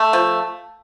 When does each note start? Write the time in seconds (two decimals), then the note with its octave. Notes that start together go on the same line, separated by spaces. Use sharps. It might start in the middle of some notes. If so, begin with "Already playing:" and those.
Already playing: A3
0.13 F3